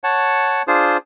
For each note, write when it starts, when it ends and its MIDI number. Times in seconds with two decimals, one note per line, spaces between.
0.04 0.62 73
0.04 0.62 78
0.04 0.62 81
0.68 0.97 62
0.68 0.97 65
0.68 0.97 68
0.68 0.97 72